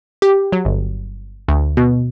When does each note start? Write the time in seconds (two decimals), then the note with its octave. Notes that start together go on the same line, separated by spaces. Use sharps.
0.22 G4
0.52 F#3
0.65 G1
1.48 D2
1.77 B2